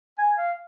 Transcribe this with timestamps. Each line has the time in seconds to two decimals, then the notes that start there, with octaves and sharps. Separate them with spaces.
0.18 G#5
0.38 F5